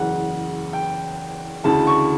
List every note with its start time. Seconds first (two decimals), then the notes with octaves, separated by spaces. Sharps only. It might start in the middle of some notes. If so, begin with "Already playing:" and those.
Already playing: F#1 E2 C#3 F#5
0.73 G5
1.64 D2 C#3 E3 A5
1.87 C#6